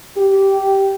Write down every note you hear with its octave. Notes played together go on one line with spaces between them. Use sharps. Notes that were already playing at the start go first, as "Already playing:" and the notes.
G4